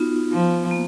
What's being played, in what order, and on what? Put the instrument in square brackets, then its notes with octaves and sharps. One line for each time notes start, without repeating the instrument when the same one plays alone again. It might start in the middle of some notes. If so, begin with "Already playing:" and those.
Already playing: [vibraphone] B3 D#4 F4 F#4
[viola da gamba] F3
[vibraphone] A#3